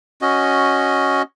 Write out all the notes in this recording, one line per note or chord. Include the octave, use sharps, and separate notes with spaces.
C#4 F#4 D#5